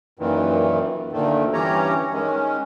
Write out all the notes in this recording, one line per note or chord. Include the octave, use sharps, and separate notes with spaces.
F#2 A#2 D#3 E3
D2 A#2 D#3 A3
G2 E3 C#4 G4 C#5 A#5
D#3 G#3 C#4